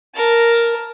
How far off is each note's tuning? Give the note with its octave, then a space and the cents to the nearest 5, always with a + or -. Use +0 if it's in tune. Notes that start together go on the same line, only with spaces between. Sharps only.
A#4 +0 A5 +5